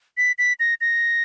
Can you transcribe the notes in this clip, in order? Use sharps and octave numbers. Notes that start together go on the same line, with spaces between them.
B6
B6
A#6
A#6